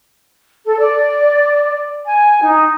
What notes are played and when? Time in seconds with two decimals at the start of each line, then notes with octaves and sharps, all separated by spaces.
0.66 A4
0.79 D5
2.06 G#5
2.42 D#4